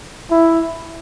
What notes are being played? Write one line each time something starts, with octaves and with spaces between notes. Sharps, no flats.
E4